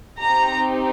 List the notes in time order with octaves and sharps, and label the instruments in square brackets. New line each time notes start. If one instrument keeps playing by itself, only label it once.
[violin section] C4 D#4 G4 A#5